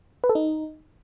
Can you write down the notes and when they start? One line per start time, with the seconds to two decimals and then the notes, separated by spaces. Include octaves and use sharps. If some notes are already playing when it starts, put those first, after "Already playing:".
0.24 B4
0.29 A4
0.35 D#4